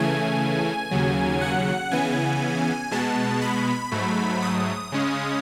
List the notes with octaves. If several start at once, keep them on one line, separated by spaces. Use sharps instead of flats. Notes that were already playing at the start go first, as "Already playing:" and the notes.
Already playing: C#3 E3 A3 G#5
D#2 C#3 F#3
F#5
C#3 E3 B3 G#5
B2 G#3 B3 A5
B5
G#2 F#3 A3
D#6
C#3 G#3 C#4